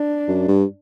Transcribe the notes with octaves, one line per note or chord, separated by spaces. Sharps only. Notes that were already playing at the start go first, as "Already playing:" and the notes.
Already playing: D4
F#2
G2